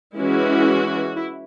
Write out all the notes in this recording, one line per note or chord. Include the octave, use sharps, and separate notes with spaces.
E3 G#3 C#4 E4 F#4
E4